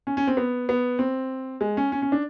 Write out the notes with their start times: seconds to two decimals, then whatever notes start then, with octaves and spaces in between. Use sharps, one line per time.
0.07 C#4
0.17 C#4
0.28 C4
0.37 B3
0.69 B3
0.99 C4
1.61 G#3
1.77 C#4
1.92 C#4
2.02 C#4
2.12 D4